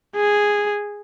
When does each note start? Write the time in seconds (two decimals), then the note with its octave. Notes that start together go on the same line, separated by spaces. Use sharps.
0.16 G#4